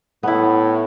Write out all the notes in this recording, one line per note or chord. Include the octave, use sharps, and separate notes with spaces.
A2 B3 E4